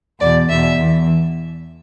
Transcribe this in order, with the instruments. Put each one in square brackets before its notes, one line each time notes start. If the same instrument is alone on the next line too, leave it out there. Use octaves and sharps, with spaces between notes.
[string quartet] E2 B2 D5
E2 B2 E5
E2 E3